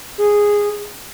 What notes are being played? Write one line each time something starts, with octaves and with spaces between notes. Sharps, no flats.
G#4